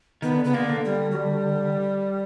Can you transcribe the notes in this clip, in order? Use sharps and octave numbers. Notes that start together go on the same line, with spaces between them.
D#3 B3
D3
C#3 B3
D3 A#3
D3
G3
F#3
G3